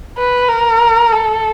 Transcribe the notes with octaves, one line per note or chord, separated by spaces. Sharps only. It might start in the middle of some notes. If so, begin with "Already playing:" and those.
B4
A#4
A4